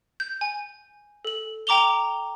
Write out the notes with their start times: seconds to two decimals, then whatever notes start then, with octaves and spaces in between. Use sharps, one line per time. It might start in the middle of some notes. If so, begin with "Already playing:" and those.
0.20 G6
0.41 G#5
1.25 A4 F#7
1.67 G5 A#5 D6 F7 G7